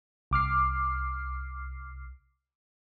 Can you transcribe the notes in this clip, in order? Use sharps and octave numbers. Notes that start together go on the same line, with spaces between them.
C2 D6 F6 C7